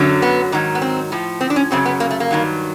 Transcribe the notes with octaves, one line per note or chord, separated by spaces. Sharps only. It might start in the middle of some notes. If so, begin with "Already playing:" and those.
Already playing: F#2 D3 F#3
B3
G#2 D#3 F#3
B3
C4
A2 F3
C4
D4
C#4
F#2 C#3 F#3 C4
B3
A#3
A3
A#3
G2 D#3 F#3